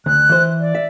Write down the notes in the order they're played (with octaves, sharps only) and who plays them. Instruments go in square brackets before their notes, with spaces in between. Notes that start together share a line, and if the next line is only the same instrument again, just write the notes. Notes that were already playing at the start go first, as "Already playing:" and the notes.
[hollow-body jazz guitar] D2 [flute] F#6
[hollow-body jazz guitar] E3 C5
[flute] D5
[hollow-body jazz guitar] E5